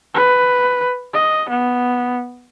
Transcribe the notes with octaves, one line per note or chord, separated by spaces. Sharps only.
B4
D#5
B3